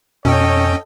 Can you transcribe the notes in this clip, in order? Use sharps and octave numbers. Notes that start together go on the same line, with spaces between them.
F2 B2 C#4 A4 C#5 D#5 G5